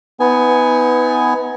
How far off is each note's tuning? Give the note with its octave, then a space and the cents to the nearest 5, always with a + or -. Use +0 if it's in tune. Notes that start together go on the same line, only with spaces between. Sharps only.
B3 +15 D#4 +40 G#5 +0